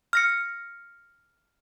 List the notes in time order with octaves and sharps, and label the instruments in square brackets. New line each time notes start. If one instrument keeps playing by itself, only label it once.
[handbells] F6 A#6 C#7